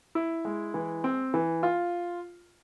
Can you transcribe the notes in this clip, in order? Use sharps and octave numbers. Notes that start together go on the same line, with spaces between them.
E4
G#3
E3
C4
E3
F4